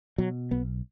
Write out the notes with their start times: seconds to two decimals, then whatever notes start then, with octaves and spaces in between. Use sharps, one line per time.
0.18 B2 F#3
0.51 B1 B3